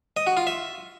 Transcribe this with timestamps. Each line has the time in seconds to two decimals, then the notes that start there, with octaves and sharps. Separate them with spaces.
0.17 D#5
0.27 F#4
0.37 F4
0.47 E5